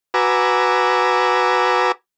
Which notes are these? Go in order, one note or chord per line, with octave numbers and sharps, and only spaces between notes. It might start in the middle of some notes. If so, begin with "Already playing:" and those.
F#4 B4 G#5 A#5 D6 E6